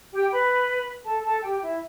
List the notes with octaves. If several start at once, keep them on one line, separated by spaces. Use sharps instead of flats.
G4 G5
B4 B5
A4 A5
A4 A5
G4 G5
E4 E5